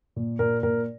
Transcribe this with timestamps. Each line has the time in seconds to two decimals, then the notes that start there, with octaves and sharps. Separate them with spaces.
0.16 A#2
0.39 A#2 A#4
0.63 A#2 A#4